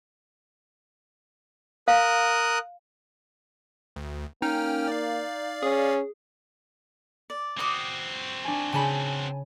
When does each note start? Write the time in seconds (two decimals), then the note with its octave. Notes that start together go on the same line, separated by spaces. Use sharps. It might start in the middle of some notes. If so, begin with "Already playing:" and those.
1.88 A#4 F5 D#6 F#6
3.96 D2
4.42 A#3 C#4 D#4 G5 F6
4.88 D5 F5
5.63 C#4 G#4
7.30 D5
7.59 C4 F#4 D6 D#6
8.45 D4 G#5
8.73 C#3 C#5 G#5 A5 B5